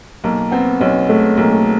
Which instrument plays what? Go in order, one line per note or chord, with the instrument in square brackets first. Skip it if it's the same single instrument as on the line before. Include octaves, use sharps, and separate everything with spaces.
[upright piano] B1 [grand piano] A#3
[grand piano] B3 [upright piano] C4
[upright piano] B1 [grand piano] C#4
[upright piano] G#3 [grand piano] A3
[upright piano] B1 [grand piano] A#3
[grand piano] A3